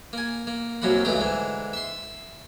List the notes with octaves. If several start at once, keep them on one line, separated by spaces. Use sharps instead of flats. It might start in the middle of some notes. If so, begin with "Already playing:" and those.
A#3 G#5
A#3
C2 F#2 F#3 A#3 F#5 B5
C#2 G2 E3 A3 G4 D#6
G#2 D3 E3
E5 C6